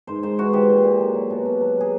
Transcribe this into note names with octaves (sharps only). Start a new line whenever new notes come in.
G#2 C5
G#2 C5
E3 F#4
E3 G4
A#2
A#2
F#3
F#3
B2
B2
F#3
F#3 G#4